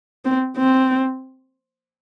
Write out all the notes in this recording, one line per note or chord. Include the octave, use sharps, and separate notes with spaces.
C4
C4